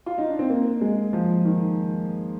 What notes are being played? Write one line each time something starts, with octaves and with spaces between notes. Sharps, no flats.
F4
D#4
D4
C4
A#3
G#3
F3
D#3